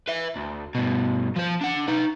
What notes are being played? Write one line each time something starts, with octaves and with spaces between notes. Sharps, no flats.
B4 E5
D2
G2 B2
F3 C5
D4 F#5
D#4 B4